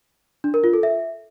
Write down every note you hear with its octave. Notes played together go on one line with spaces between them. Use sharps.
D4
A#4
F4
A4
E5